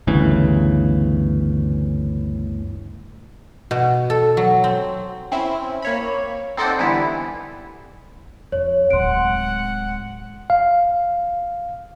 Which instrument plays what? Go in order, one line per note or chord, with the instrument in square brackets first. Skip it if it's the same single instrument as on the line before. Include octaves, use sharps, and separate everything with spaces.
[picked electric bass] G1 D2 C#3 E3
[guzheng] B2
A4
F#3
C4
[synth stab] C4 C#4 E4
A#3 C#5 B5
C4 D#4 A4 C5 D5 F#5
D3 E3 G3 B3 E4
[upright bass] F2 [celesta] C#5
[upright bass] D1 G#3 [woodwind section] F#5 [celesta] C6 D7
[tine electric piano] F5